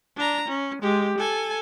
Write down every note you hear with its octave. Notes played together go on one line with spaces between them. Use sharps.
D4 A#5
C#4
G#3 G4
A4 G#5